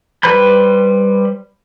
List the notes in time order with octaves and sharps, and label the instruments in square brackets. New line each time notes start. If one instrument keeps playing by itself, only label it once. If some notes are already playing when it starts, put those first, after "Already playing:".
[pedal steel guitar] G3 B4 C5 B5 G6